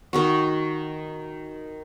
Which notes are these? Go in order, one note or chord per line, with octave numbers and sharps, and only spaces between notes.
D#3 D#4 F#4